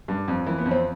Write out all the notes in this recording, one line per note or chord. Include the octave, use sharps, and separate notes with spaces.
G2
F2
E3
B3
F2
C4